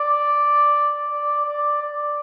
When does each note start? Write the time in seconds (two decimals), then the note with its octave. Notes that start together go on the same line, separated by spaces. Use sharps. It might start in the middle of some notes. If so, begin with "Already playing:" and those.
Already playing: D5
1.09 D5
1.45 D5
1.82 D5